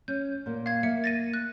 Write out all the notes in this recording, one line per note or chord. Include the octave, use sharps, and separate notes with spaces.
C#4 G6
A#2 A#3
F5 G#6
A#3 E5 C#7
A6 A#6 D#7
F#6